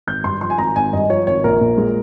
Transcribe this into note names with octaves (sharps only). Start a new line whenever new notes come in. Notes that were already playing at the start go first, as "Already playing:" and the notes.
G#1 G6
G2 C6
F3 C6
G#5
G#1 A#5
G#1 G#5
G2 D#5
F3 C#5
G#1 C#5
A#1 A#4
A#2
G#3